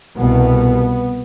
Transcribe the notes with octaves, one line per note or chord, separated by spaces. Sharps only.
C2 B2 B3